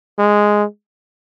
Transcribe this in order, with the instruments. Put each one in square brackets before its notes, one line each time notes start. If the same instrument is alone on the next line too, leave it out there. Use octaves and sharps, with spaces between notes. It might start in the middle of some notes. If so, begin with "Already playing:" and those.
[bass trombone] G#3